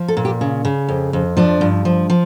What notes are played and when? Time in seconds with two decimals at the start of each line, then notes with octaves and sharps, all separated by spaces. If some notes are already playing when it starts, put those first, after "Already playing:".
Already playing: F3
0.08 A4
0.17 A#2
0.25 G4
0.41 C#3
0.65 C#3
0.88 F2
1.13 F2
1.37 F3 D4
1.61 G2
1.85 F3
2.10 F3